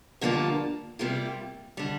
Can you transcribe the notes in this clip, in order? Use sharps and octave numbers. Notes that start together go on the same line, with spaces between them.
G2 D3 F3 A#3 F4
C3 G3 A#3 F4
D3 G3